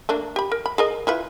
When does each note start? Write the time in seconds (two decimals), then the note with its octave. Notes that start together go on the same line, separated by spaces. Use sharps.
0.09 A3 A#3 D4
0.36 G4 B5
0.52 A#4
0.66 B5
0.78 G#4 A#4 D#5
1.07 E4 F4 B4